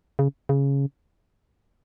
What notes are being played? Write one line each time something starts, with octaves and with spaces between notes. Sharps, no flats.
C#3
C#3